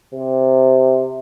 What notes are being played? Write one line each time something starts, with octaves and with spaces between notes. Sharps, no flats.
C3